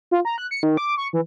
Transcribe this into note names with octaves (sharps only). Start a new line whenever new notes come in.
F4
A#5
F#6
C#7
D#3
D6
C#6
E3